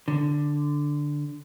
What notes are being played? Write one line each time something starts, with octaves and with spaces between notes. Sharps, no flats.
D3